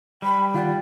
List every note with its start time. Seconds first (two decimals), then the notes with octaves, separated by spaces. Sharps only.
0.22 G3 G5 B5
0.54 D#3 F4 D5 F#5